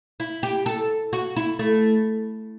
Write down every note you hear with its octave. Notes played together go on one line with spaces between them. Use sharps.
E4
G4
A4
F#4
E4
A3